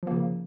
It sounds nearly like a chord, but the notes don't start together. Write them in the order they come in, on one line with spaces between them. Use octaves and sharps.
F3 A#3 C#3